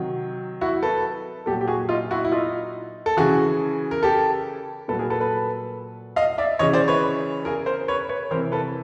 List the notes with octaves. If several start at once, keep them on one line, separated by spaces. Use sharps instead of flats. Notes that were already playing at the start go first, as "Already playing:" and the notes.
Already playing: C3 D#3 F#3
E4 F#4
A4 B4
A#2 F#3 G4 A4
G4
F#4 G#4
D#4 F4
E4 F#4
E4
D#4 F4
A4
C#3 E3 F#4 G#4
A#4
G4 A4
A#2 F#3 A4 B4
G#4 A#4
A4 B4
A4 B4
D#5 F5
D5 E5
C#3 E3 C#5 D#5
C5 D5
B4 C#5
G#4 A#4
A#4 C5
B4 C#5
B4 C#5
C3 E3 A#4 C5
A4 B4